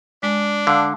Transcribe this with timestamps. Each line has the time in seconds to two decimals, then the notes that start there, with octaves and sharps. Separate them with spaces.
0.23 G#3 D4
0.67 D3 F5 A5